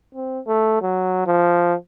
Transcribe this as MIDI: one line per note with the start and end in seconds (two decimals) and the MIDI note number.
0.15 0.39 60
0.47 0.81 57
0.82 1.22 54
1.27 1.74 53